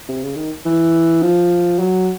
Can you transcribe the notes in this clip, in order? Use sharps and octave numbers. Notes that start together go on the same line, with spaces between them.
C3
C#3
D#3
E3
F3
F#3